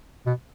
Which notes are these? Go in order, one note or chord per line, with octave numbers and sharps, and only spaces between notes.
B2